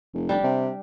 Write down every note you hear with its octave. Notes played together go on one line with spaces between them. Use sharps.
F1
G3 D4 G4
C3